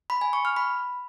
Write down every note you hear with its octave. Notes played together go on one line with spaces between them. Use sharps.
B5
G#5
C#6
F6
B5